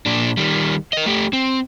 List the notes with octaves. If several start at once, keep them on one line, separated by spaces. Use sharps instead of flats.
A#2 D4
D#3 G3
A#4 D#5
A3 G4
C4